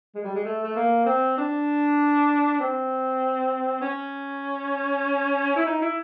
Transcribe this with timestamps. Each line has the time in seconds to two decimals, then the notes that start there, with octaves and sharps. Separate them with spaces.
0.15 G#3
0.24 G3
0.35 G#3
0.45 A3
0.64 A3
0.76 A#3
1.06 C4
1.38 D4
2.60 C4
3.82 C#4
5.56 E4
5.66 D#4
5.82 E4